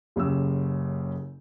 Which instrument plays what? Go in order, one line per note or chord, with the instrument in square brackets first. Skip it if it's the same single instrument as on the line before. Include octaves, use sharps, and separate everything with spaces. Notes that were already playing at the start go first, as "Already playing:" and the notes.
[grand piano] F#1 C#3 G4 E6